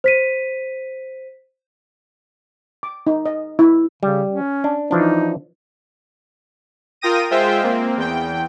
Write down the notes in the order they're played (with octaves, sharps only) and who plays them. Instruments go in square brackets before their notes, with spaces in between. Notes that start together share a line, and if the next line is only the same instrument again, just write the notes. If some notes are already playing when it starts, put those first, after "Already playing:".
[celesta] C5 B6 D#7
[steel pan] D6
D#4
D#5
E4
[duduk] C#3 [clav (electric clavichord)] G3
[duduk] C#4
[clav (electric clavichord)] D4
[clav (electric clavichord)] E3 F3 D4 [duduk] D#4
[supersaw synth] F4 A#4 G5 D#6 A#6 D#7
G#3 F4 C5 E5 G5
A#3 C4
E2 G5